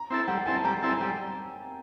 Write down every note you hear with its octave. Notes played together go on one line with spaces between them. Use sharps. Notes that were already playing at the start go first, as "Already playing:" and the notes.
Already playing: A#5
C4 E4 A4
G3 F#5
G5
C4 E4 A4 G#5
A5
G3 A#5
A5
C4 E4 A4
G#5
G3 G5